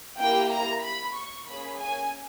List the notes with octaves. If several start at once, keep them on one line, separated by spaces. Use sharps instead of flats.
A#3 E4 G4 G5
A#5
B5
C#6
A#3 C#4 G#4 B5
G#5